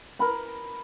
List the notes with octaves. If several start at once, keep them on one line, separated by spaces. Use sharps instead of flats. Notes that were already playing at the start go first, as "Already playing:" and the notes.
A#4 B5